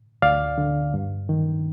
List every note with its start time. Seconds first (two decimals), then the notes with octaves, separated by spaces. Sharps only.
0.22 D2 D5 F5
0.58 D3
0.94 G2
1.29 D#3